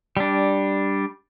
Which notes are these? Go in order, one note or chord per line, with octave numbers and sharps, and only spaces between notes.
G3 D4